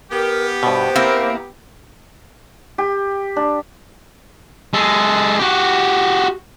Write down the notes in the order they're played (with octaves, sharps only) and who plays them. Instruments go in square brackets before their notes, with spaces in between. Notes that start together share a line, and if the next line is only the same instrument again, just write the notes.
[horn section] B3 G4 [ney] A#4
[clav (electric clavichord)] G2 B2 [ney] C5
[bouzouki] A#3 E4 [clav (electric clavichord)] C4
[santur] G4
D4
[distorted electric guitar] G#3 A4
F#4 G4